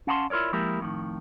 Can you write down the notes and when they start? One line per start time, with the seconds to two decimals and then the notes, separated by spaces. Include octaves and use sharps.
0.07 C#4 F5 F#5 A5 B5 C6
0.30 E4 F4 A#4 C#5 D5
0.53 F3 G#3 A#3 E4 G4 A#4
0.80 F2 A2 D#3